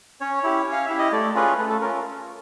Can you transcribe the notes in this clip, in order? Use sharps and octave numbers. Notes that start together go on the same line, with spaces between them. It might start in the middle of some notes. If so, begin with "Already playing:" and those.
C#4 C#5
E4 G4
C#4
F5
E4 G4 E5
D#5
A3 D5
C#4 F4 G#4 B4
A3 B4
A4
C#4 F4 A#4